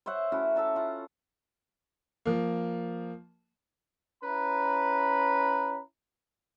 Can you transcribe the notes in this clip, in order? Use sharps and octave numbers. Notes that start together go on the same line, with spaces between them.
C5 C#5 E5 F#5
A3 C#4 E4 F#4
A4 E5 A5 A#5
F4 F#5
F3 A#3
C#4 E4 B4 A#5 B5